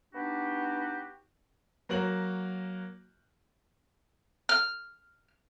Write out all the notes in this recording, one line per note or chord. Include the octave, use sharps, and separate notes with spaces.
B3 D4 D#4 F#4 G4
F#3 A#3 F#4 A#4 F#7
F6